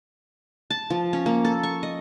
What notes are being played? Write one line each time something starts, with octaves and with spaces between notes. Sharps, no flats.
A5
F3
C#4
A#3
A4
C#6
D#5